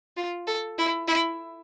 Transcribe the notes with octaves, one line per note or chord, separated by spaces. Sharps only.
F4
A4
E4
E4